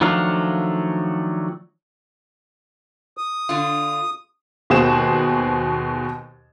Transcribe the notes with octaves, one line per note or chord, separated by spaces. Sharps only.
D#3 F3 F#3 A3 D4 F5
D#6
D3 F4
D#2 B2 G#4 C5 E7